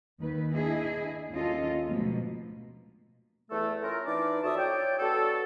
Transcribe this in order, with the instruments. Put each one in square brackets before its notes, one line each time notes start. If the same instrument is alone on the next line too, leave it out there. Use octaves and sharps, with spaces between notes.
[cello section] D#2 D#3 B4
D4 E4 G#4 D#5
D#2 C#4 F4 A4 D#5
D2 G#2 B2 F3 A#3
[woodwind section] E2 A3 A4
C#4 E4 F4 A#4
E3 D4 D#4 D5
F2 E4 F#4 E5 A5 D#6
C#5 D5 G5
B3 D4 F#4 A4